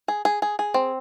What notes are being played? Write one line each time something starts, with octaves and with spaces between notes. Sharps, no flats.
G#4
G#4
G#4
G#4
C4